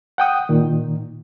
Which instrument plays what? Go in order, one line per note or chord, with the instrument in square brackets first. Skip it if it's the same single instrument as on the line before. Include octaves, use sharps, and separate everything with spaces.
[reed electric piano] F#5 G5 D#6
A#2 D#3